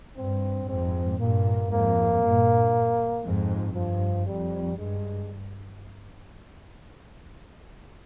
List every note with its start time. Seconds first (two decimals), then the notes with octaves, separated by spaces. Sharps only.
0.17 G2 C4
0.68 F2 G#2 C4
1.19 G2 A#2 A#3
1.70 F2 G#2 A#3
2.21 G2 A#2
3.24 F2 G#2
3.75 G2 F3
4.27 F2 G3
4.78 G2 G#3